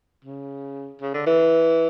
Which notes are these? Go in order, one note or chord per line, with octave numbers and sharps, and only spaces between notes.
C#3
C#3
D3
E3